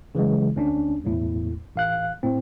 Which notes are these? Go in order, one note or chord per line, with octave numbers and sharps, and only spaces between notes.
C#3 E3 F#3 G#3
D2 C#4 D4
B1 E2 A2
A1 F5 F#6
A2 C4